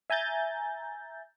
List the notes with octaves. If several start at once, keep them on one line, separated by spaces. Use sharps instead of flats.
E5 G#5 A#5 G6 A6